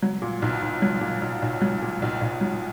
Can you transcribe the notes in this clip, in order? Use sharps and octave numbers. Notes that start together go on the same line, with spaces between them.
F#3
A#2
B1
B1
F#3
A#2
B1
B1
F#3
A#2
B1
B1
F#3